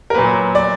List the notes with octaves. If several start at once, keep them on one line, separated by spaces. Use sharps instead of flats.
A#4
A#2 F#3 A#3 B4
D5